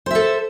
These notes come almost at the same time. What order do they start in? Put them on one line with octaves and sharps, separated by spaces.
C5 E5 A4